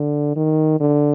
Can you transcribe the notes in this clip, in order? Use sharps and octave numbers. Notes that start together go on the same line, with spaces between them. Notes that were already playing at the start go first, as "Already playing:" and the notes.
Already playing: D3
D#3
D3